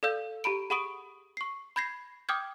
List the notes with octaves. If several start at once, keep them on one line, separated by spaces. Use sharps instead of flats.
A4 D5 F5 E6 G6
G4 A#5 B5 D7
G#4 F#5 B5 C#6 D#6 D7
C#6 C7
B5 G6 G#6 A#6 C7
G5 D6 D#6 F6 G6 G#6